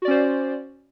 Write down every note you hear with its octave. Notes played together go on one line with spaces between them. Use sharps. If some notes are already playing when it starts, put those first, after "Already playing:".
C#4 F#4 C5 D5